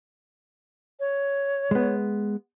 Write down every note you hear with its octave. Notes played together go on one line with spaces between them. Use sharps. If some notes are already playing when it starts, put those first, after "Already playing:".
C#5
G#3 B3